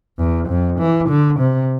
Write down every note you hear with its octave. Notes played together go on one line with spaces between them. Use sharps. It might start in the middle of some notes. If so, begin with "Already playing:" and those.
E2
F2
E3
D3
C3